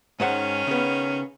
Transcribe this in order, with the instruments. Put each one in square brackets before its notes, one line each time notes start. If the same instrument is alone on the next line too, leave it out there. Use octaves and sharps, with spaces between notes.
[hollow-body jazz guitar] G#2 C5 F#5 [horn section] D#3 C#4
[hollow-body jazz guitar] C#3 B3